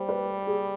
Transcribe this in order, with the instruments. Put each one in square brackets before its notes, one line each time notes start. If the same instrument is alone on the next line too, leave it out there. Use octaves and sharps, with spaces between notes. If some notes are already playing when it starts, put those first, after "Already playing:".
Already playing: [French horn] G3 [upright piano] C5
[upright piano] B4
G#4